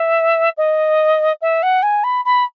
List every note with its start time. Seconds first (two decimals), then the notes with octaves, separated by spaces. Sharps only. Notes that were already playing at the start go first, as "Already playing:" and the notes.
Already playing: E5
0.57 D#5
1.41 E5
1.62 F#5
1.82 G#5
2.03 B5
2.25 B5